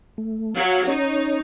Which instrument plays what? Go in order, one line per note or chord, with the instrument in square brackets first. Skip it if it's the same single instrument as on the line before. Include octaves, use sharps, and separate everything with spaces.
[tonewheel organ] A3
[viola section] F#3 [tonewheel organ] F5
[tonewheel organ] C#4 C#5 [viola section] D#4